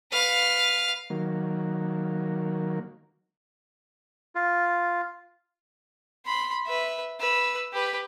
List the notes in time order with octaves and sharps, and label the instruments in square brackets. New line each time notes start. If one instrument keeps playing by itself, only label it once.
[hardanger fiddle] B4 F5
[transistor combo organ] D#3 F#3 A#3
[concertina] F4
[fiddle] B5 C6
B4 E5
B4 E6
G4 B4